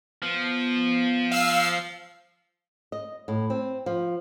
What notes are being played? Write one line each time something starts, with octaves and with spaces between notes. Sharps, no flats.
F3 B3
F5 E6 C7
D#5
A2
C4
F3